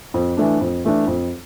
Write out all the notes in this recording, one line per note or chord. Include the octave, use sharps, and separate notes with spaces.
F2
E3 A3 D4
F2
E3 A3 D4
F2